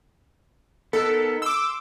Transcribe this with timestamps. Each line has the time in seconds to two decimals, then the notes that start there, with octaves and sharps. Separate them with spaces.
0.93 B3 D#4 A4 A#4
1.42 C6 D6 E6